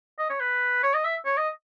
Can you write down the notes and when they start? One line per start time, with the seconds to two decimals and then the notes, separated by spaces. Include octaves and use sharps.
0.19 D#5
0.30 C#5
0.40 B4
0.83 C#5
0.94 D#5
1.04 E5
1.25 C#5
1.37 D#5